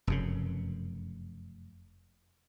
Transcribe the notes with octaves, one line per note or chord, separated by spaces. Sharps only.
F1 F#2 C#3